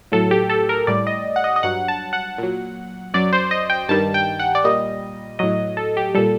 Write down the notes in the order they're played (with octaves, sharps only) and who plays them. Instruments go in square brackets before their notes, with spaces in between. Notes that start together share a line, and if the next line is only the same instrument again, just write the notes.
[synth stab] A2 F#3 A4
G4
A4
A#4
A2 G3 D5
D#5
F#5
D#5
D#5
G2 F#3 F#5
A5
F#5
A#2 F#3
F#2 F#3 D5
C5
D#5
G5
G2 D#3 G3 A5
G5
F#5
D5
A#2 G3 D#5
A2 F#3 D#5
A4
G4
A#2 G3 A4